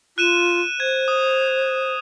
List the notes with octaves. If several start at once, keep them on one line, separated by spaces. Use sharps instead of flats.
F4 F#6 D#7 E7
C5 G#6
D#6